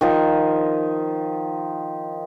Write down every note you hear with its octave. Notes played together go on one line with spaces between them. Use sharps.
D#3 F3 D#4